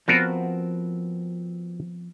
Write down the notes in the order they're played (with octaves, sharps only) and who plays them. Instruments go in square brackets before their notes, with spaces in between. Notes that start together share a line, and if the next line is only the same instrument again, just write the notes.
[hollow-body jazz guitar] F3 B3 C4 [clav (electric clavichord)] F4 F#4 A#4